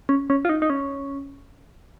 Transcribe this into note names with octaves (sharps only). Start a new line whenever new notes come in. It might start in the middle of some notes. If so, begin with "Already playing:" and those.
C#4
C#4
F4
D#4
D#4
C#4